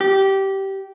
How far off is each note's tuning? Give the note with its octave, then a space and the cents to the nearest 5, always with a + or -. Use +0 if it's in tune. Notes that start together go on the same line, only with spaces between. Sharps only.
G4 -15